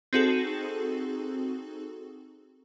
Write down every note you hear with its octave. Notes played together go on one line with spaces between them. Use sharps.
C4 D#4 F#4 G#4 A4